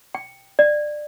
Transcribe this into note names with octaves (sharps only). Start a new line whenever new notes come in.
G5
D5